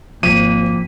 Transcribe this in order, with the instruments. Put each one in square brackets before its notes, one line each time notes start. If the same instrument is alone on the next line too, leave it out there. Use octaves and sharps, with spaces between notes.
[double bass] G#1 [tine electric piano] F3 B6 [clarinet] A#3 [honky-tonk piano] D#7